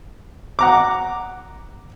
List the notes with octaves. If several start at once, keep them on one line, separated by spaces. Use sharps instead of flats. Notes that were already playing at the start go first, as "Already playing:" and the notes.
F#5 A#5 D6